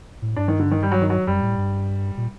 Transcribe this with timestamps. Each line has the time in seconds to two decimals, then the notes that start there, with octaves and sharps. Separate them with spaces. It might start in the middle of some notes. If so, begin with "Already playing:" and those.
0.22 A2
0.36 G2 D4
0.48 D#3
0.59 D3
0.71 D#3
0.83 G3
0.92 F#3
1.02 D#3
1.10 F#3
1.27 F#2 G3
1.42 A2
1.57 G2
2.17 A#2